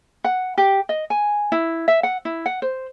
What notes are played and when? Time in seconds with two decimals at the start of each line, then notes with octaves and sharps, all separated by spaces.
0.24 F#5
0.58 G4
0.89 D#5
1.10 G#5
1.52 E4
1.88 E5
2.03 F#5
2.25 E4
2.46 F#5
2.62 C5